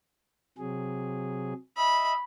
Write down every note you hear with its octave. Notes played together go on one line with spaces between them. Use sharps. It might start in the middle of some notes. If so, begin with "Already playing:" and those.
C3 F#3 G#4
D#5 E5 B5